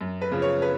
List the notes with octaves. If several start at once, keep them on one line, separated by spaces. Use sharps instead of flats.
F#2
B4
C#3 F3
C#5
B4